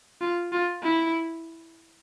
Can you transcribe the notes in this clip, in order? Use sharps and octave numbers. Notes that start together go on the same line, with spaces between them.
F4
F4
E4